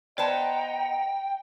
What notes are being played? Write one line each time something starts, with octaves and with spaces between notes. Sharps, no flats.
B3 C5 D5 D#5 F#5 G5 A5 A#5